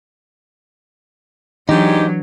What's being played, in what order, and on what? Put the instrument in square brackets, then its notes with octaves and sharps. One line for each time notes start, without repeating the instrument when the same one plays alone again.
[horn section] G#2 G4 [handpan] E3 D4 [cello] F#3 [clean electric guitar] D#4